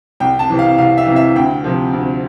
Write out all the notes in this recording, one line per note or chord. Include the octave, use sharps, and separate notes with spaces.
C2 G5
A5
C3 E3
F5
C2 F5
E5
C3 E3
E5
D2 G5
C3 F3
D2